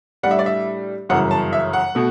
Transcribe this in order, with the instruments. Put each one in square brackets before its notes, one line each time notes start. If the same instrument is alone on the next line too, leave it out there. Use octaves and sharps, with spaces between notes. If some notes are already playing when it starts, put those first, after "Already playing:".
[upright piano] A2 G3 D4 F#5
E5
D5
E5
G1 F#2 C#3 E3 F#5
A5
E5
F#5
B2 A3